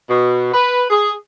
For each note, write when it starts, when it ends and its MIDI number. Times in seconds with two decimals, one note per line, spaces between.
0.09 0.48 47
0.53 0.84 71
0.90 1.11 68